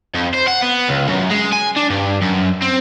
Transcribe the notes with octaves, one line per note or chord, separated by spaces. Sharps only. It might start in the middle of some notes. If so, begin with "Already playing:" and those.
F2
C5
F#5
B3
C#2
F#2
G#3
G#5
D4
G2
F#2
C4